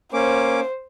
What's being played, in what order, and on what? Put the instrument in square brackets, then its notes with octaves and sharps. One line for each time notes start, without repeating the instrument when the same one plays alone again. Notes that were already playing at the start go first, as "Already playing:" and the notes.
[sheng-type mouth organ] A#3 C#4 D6 [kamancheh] C5